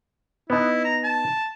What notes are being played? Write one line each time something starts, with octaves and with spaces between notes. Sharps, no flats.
B3 D#4 E4
A#5
A5